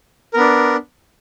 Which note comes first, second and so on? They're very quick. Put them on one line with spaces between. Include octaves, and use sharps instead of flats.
A#4 B3 D4